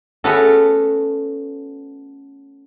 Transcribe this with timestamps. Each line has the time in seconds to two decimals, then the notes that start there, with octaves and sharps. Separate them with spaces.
0.24 A3 B3 C#4 F#4 A4